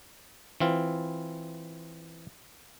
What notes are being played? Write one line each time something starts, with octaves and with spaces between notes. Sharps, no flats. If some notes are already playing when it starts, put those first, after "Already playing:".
E3 C4 F4